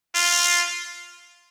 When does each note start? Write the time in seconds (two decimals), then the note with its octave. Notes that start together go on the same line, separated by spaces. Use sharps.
0.15 F4